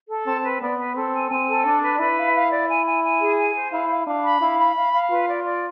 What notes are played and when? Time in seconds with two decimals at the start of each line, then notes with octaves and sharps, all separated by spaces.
0.09 A4
0.26 C4 A5
0.44 B4
0.61 B3 D5
0.79 B4
0.95 C4 A4
1.13 G#5
1.30 C4 G#5
1.48 A4
1.64 D4 D5
1.82 B4
1.99 E4 B4
2.16 F5
2.34 F5
2.51 D5
2.69 G#5
2.86 G#5
3.04 G#5
3.20 G#4
3.37 G#5
3.55 C5
3.72 E4 F5
3.89 F5
4.07 D4 F5
4.24 B5
4.41 E4 F5
4.58 B5
4.76 F5
4.93 F5
5.10 F4 B4
5.27 D5
5.45 D5